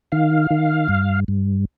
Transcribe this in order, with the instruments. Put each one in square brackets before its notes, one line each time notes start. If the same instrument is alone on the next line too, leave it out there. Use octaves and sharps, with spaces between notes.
[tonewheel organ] D#3 F5
D#3
G2
G2